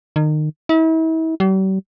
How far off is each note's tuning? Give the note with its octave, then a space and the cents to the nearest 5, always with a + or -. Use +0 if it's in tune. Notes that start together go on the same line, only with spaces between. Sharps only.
D#3 -30
E4 -40
G3 -45